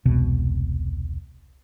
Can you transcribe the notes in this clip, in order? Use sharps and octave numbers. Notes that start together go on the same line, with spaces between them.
E1 C2 B2